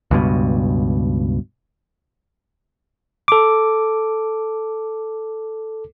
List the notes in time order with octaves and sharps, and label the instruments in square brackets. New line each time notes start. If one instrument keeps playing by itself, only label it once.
[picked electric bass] C#2 G2 B2
[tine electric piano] A4 D6